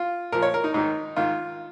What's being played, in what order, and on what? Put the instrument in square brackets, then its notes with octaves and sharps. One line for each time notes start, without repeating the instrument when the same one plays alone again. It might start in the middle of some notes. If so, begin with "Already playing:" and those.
Already playing: [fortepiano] F4
A#2 F3 A#4
C#5
A#4
D#4
G#2 D#3 D#4
G#2 D#3 F4